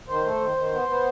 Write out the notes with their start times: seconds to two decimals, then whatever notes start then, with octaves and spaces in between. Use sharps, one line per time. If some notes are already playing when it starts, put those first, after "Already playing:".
0.09 D#3 C5
0.25 A3
0.41 D#3
0.57 D#3
0.73 B3
0.88 B3